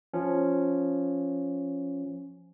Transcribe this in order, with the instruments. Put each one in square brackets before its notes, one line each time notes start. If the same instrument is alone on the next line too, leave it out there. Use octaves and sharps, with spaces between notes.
[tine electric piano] F3 C#4